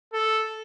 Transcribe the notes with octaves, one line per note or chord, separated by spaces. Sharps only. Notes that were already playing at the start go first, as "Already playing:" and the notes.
A4